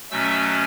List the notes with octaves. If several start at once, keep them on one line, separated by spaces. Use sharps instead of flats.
B2 F#3 A3 C#4 E5 E6